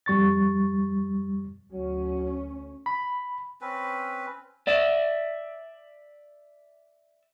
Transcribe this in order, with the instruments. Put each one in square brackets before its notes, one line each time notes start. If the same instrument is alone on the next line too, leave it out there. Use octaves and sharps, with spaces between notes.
[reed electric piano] F2 G3 C#6 A6
[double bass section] D2 C#4 [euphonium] F#3
[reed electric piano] B5
[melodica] C4 C#4 B4
[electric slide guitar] D5 E5